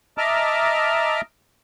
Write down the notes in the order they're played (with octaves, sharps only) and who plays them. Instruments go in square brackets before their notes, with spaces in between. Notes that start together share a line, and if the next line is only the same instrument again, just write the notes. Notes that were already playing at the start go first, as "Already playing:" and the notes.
[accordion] D#5 E5 A5 A#5 D6 F6